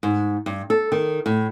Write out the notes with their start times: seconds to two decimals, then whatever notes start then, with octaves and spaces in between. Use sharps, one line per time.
0.03 G#2
0.46 G2
0.70 A4
0.92 D#3
1.26 A2